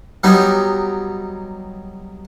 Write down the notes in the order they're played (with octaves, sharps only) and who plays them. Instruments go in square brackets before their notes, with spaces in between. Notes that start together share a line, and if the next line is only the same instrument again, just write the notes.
[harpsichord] F#3 G3 B3 D#4 G4